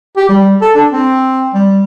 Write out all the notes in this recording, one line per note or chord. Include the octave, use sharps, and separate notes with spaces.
G4
G3
A4
D4
C4
G3